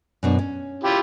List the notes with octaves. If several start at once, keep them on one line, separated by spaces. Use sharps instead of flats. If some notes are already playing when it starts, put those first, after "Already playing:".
F#2 B2 D4
C#4
E4 F4 G4